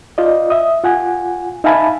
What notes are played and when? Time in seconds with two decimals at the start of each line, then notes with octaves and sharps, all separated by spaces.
0.18 F4 D5 D#5
0.50 E5 D#6
0.83 F4 F#5 G#5
1.64 D#4 E5 F5 G#5 A5 B5